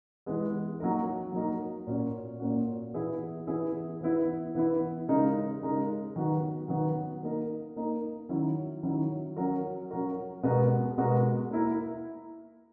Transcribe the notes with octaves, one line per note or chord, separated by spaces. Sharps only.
E3 G#3 B3
F#3 A#3 D#4 A#4
F#3 A#3 D#4 A#4
A#2 A#3 C#4 F#4
A#2 A#3 C#4 F#4
E3 B3 E4 G#4
E3 B3 E4 G#4
E3 B3 E4
E3 B3 E4
C#3 G#3 D#4 A#4
C#3 G#3 D#4 A#4
D#3 F#3 B3 F#4
D#3 F#3 B3 F#4
A#3 D#4 A#4
A#3 D#4 A#4
D#3 F#3 C#4 E4
D#3 F#3 C#4 E4
F#3 C#4 F#4 A#4
F#3 C#4 F#4 A#4
B2 G#3 B3 F#4 A#4
B2 G#3 B3 F#4 A#4
A#3 E4 A#4